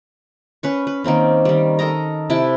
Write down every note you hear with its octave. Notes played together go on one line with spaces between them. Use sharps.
C#4 B4 C#6
B4
D#3 A#3 C4 C#4
D#3 G3
A4 A#4 D#5 A#5
C3 E4 G5 A5